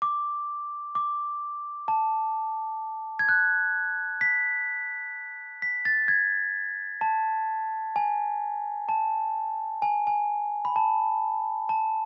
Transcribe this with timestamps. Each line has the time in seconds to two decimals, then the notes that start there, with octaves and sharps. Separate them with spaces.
0.02 D6
0.95 D6
1.88 A5
3.19 G#6
3.29 F#6
4.21 B6
5.62 B6
5.85 A6
6.08 G#6
7.01 A5
7.96 G#5
8.89 A5
9.82 G#5
10.07 G#5
10.65 B5
10.76 A5
11.69 A5